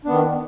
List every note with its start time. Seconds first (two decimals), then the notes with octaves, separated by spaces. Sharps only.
0.05 D4
0.08 B3
0.10 D#3